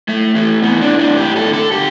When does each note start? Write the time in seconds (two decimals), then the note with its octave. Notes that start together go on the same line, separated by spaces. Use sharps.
0.08 A2 A3
0.35 E3 A3
0.63 E3 B3
0.81 D4
0.90 A2
0.99 D4
1.17 G2 G4
1.36 A4
1.44 D3
1.53 A4
1.71 D3 G4